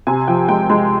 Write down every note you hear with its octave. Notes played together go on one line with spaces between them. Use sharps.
C3 G#5
F3 G5
G#3 G5
G#3